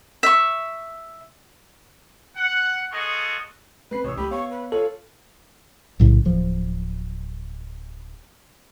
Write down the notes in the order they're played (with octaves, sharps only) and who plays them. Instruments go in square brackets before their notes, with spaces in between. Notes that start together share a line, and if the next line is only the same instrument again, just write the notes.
[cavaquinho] E5 C#6
[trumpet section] F#5
F4 F#4 G#4 A4 D#5 C#6
[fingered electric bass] A3 C4 [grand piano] B4 C7 [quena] B5
[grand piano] A1 E6 [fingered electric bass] C3 [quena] C#5
[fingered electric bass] C#2 A3 [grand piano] G4 [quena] B5
[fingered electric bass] B3 [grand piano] C#5 F5 [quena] C#6
[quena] B4
[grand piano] F4 C#5 [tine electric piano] A4 [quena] F5
[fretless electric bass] B1 A2 C#3
D1 F3